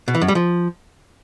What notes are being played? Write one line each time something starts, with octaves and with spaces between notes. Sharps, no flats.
B2
E3
F#2
G3
F3